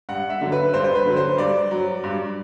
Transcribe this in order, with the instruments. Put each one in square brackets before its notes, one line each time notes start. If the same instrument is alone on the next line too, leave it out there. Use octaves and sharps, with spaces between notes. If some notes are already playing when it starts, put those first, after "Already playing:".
[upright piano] G2 F#5
E5
D3 F#3
B4
G2 C5
C5
B4
D3 F#3
C5
G2 D5
F#3
G2